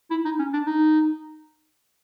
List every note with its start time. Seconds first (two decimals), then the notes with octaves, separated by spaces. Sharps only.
0.11 E4
0.25 D#4
0.39 C#4
0.53 D4
0.66 D#4